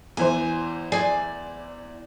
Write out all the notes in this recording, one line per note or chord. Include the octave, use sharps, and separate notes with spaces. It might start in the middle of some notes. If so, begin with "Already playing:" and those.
E2 E3 C5 G#5
G#4 D5 G#5